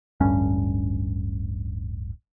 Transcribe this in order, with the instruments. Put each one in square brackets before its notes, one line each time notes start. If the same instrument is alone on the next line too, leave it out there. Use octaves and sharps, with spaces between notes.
[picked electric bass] D1 A1 G2 C#4